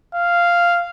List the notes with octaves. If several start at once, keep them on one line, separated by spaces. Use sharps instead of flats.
F5